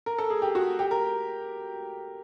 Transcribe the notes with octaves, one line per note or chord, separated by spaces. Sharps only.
A#4
A4
G#4
G4
F#4
G4
A#4